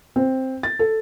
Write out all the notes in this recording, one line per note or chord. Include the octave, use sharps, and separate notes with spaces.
C4
A6
A4